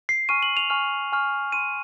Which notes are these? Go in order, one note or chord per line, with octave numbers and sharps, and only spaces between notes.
C7
G#5 C#6 F6 D#7
F#7
F7
G#5 C#6 F6
G#5 C#6 F6
C6 F6 D#7